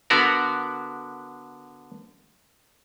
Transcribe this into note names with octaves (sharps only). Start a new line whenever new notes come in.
D3 B3 F#4 A#4